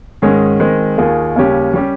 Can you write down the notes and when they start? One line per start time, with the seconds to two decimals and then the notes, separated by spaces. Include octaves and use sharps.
0.22 G#2 D#3 G#3 C#4 G#4
0.60 D#3 G#3 C4
0.97 D#2 D#3 A#3 F4 G#4
1.36 D#2 C#3 G3 C#4 G4
1.73 G3 C#4 G4